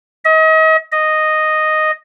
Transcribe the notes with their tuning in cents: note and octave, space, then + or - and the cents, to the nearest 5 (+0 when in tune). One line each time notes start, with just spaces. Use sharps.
D#5 +35
D#5 -5